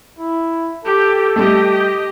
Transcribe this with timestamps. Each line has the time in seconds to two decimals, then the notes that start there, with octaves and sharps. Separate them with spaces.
0.19 E4
0.85 G4 A4
1.36 G3 A3 G4 D#5